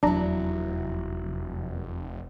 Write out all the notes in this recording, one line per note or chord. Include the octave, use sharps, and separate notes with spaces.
F1 E2 F#3 D4 E4 A#5